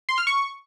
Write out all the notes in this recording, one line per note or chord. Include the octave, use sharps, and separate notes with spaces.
C6
F6
C#6